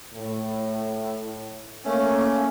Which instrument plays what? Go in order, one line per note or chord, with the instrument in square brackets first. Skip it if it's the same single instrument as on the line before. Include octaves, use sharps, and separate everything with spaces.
[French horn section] A2
[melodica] A3 C#4 [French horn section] A#3